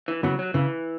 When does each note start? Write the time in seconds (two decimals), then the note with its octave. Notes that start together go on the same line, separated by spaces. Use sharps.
0.08 E3
0.23 C#3 E3 F#3 B3 F#4
0.39 F#3
0.54 C#3 E3